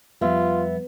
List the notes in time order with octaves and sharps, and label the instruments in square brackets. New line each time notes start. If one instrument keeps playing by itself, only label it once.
[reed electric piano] F2 E5 [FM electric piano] F3 G3 [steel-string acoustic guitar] B3 [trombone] F4